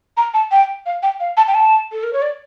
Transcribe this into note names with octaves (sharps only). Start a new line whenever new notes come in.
A#5
A5
G5
F5
G5
F5
A5
G5
A5
A4
A#4
C#5
D5